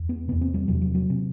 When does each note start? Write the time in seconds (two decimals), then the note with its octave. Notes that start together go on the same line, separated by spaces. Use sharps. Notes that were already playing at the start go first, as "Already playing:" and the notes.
Already playing: E2
0.09 B3
0.28 E2 C3 B3
0.41 C4
0.54 G3
0.68 E2 C3 F#3
0.82 F#3
0.95 F#3
1.10 C3